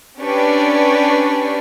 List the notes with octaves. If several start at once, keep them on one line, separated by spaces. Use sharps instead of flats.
C#4 D4 G4 B4 D5 C#6